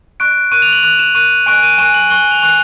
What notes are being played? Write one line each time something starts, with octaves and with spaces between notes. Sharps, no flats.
C#6 F#6 D7
C#6 F#6 D#7
F7
F#7
C#6 F#6 F7
E7
C#6 F#6 D#7
G#5 C#6 F#6 D7
D#7
G#5 C#6 F#6 E7
F#7
G#5 C#6 F#6 G7
F7
G#5 C#6 F#6 F7